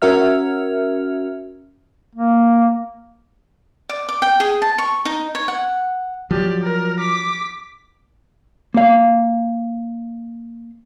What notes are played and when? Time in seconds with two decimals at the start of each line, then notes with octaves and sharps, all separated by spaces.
0.02 C#4 F#4 A#4 E5 F6
2.15 A#3
3.89 D5
4.09 D6
4.22 G5
4.40 G#4
4.62 A5
4.78 C#6
5.05 D#4
5.35 C#5
5.48 F#5
6.31 F3 F#3 G4 D5
6.63 A#4
7.00 D6 B6
8.74 A#3 F5